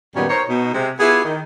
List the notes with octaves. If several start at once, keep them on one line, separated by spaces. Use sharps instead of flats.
F#2 A#2 D#3 G3 B3 C#4
D#4 A#4 C5 C#5
B2 D#4 F#4
C3 G#3
B3 E4 F4 G4 G#4
D#3